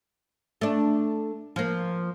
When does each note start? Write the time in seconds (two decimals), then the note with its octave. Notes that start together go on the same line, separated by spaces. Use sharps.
0.61 A3 D4
1.56 F3 A#3